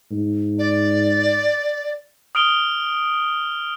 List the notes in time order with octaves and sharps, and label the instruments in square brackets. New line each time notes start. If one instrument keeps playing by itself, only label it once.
[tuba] G#2
[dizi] D5
[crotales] D#6 F6 D7 F7 G7